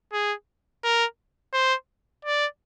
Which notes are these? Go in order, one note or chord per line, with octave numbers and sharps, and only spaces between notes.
G#4
A#4
C5
D5